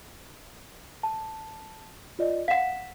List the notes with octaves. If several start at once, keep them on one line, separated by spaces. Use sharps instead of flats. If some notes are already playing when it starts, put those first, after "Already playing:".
A5
F4 D5 D#5
F5 F#5 B6 E7